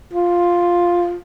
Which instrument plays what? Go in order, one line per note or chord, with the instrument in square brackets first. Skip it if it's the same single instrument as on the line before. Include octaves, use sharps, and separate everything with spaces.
[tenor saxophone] F4